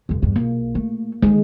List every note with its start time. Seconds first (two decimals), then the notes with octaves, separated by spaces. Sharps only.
0.09 F1 F2
0.23 E2 G2
0.36 B1 A#3
0.75 A3
1.23 D3 D#3 G#3